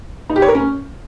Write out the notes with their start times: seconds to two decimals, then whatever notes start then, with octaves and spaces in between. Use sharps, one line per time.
0.30 D#4
0.36 G4
0.42 C#5
0.48 A#4
0.55 C#4